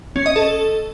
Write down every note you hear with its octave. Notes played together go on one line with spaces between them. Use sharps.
C#4
D#5
A4